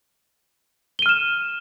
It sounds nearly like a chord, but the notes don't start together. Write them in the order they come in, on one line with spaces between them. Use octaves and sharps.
G7 D#7 F6 E7